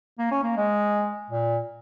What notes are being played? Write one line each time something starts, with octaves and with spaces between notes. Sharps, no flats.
A#3
C#4
A#3
G#3
A#2